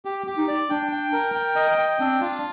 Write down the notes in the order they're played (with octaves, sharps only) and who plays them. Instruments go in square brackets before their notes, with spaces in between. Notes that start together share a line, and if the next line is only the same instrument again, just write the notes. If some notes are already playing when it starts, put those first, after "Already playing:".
[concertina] G4
G4
[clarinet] D#4
[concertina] D5
[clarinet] D4 [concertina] G5
[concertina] G5
A#4
G5
D#5
G5
[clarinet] C4 [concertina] D4
[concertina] F4